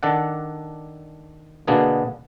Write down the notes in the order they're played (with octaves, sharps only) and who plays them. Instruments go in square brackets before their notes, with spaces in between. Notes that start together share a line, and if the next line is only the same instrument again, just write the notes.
[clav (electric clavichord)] D#3 D4 A4 D5 F#5
B2 D3 A#3 B3 D4 G#4